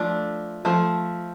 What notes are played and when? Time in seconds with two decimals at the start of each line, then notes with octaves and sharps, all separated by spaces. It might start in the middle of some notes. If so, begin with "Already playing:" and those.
Already playing: F3 A3 D4
0.65 F3 A3